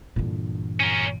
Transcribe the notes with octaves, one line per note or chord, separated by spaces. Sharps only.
G2 A#2 D3 E3
C#4 A#4